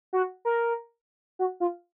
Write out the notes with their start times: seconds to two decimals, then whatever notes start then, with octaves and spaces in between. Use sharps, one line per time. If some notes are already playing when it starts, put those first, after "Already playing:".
0.13 F#4
0.45 A#4
1.39 F#4
1.60 F4